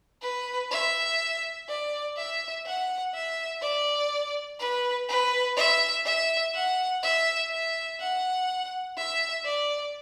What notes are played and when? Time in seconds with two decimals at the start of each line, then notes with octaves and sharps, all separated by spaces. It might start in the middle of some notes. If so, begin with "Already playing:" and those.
0.22 B4
0.71 E5
1.68 D5
2.17 E5
2.66 F#5
3.14 E5
3.62 D5
4.60 B4
5.09 B4
5.57 E5
6.06 E5
6.54 F#5
7.03 E5
7.51 E5
8.00 F#5
8.97 E5
9.46 D5